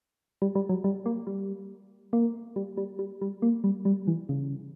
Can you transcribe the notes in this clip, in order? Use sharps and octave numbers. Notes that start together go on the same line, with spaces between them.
G3
G3
F#3
G3
A#3
G3
A#3
G3
G3
G3
G3
A#3
G3
G3
E3
C#3